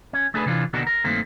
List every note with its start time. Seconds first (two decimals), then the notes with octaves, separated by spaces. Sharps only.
0.13 C#4
0.34 A3 D4 G#4 A4 B4
0.46 C3 E3 D4 F4
0.73 D#2 B2 D3 D4 F#4 A#4
0.87 A#4
1.04 G2 D#3 A3 A#3 C4